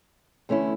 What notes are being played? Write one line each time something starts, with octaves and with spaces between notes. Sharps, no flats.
E2 D3 A3 C#4 E4